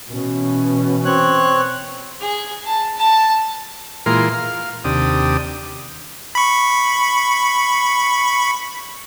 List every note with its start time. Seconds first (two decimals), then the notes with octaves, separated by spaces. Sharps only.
0.10 B2 E3 C#4
1.05 C4 C#5 F#6
2.20 G#4
2.65 A5
2.96 A5
4.06 A#2 E3 G#3 F4 A#4 C6
4.34 F5
4.84 D#2 C3 D4 G4 D#6
6.35 B5 C#6